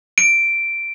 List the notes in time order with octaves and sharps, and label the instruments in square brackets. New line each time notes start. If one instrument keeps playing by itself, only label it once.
[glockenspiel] D7